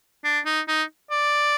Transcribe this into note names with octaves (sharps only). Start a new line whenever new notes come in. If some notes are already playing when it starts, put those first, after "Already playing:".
D4
D#4
D#4
D5